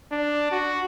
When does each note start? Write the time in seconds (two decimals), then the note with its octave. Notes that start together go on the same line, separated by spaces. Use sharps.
0.12 D4
0.52 F#4